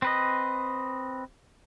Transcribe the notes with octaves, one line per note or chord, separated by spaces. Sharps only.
C4 B4 D#5